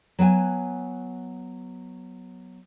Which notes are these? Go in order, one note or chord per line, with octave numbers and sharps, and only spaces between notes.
F#3 B3 G5 G#5